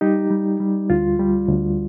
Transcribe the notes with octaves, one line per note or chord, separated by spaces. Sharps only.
G3 D#4 G4
G3
G3
D2 F4
G3
D2